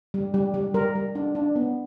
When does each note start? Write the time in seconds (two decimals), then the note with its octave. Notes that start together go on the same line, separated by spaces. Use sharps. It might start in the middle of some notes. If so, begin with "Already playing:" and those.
0.14 G3
0.34 G3
0.54 G3
0.74 G3 A#4
0.95 G3
1.15 D4
1.35 D4
1.56 B3